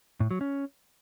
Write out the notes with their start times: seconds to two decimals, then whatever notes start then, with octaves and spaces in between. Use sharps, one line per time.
0.20 A2
0.31 F#3
0.41 C#4